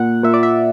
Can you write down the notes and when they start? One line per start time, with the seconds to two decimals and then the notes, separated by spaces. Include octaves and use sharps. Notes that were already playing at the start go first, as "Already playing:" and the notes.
Already playing: A#2 F#5
0.23 A#2 E5
0.34 D5
0.43 E5